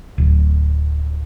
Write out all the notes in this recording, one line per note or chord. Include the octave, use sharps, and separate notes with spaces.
D1